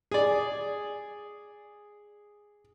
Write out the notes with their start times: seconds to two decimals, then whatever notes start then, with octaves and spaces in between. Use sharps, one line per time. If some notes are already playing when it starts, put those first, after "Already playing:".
0.11 G#4 D5